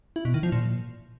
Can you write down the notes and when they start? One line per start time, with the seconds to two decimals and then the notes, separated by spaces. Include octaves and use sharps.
0.16 E4
0.25 B2
0.34 D#3
0.43 F3
0.52 A#2